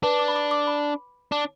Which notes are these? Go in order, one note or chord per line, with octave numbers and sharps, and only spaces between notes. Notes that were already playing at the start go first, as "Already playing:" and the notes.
D4 B4
D6
B5
D6
D6
B5
D4